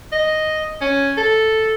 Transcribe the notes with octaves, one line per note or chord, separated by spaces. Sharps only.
D#5
C#4
A4